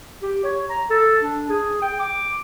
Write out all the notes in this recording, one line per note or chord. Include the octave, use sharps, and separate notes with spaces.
G4
C#5
A#5
A4
D4
G#4
G5
D6